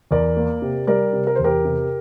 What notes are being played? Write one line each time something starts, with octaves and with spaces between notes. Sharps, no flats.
E2 A#4 D5
A#3
C3
G3 A#4 D5
C3
A#4
E2 C5
G4 A#4
C3